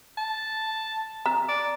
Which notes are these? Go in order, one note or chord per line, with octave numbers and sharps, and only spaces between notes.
A5
A#5
D5